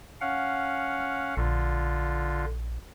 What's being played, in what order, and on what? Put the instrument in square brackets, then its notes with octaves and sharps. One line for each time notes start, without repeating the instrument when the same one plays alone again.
[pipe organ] C#4 F5 F#5
[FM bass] A#1 [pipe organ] D3 F4